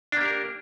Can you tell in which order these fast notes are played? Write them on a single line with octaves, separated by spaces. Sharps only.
D4 A#3 G4 A#4